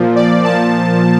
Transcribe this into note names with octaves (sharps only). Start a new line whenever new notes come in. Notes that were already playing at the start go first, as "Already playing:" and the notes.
Already playing: A#2 F3
D5
A#2 F3 A5